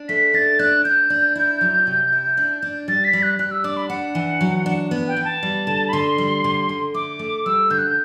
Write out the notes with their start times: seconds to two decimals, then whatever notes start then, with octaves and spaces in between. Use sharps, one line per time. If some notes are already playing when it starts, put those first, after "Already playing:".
Already playing: D4
0.09 A3 B6
0.34 D4 A6
0.59 D4 F#6
0.84 D4 G6
1.10 D4
1.35 E4
1.61 F#3
1.87 C3
2.12 E4
2.37 D4
2.62 D4
2.88 G3 A6
3.04 B6
3.13 G3
3.23 F#6
3.38 G3 F#6
3.51 E6
3.64 D4 D6
3.77 B5
3.89 D4 F#5
4.15 E3
4.41 F#3
4.66 D4
4.91 B3
5.08 G5
5.17 B3
5.25 A5
5.43 G3
5.67 D3
5.89 B5
5.93 D3 C6
6.18 G3
6.44 D3
6.69 D3
6.94 A3 D6
7.19 A3
7.46 G3 E6
7.70 D3 G6
7.78 F#6
7.87 G6